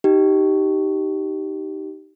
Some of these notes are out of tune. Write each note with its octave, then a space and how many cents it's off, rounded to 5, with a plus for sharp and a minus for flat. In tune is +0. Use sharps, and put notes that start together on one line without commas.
D#4 +0 G4 -20